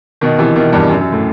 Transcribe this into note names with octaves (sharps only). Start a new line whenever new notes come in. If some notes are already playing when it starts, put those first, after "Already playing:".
B2 D#3
C3 E3
B2 D#3
E2 G2
F#2
F#2
A2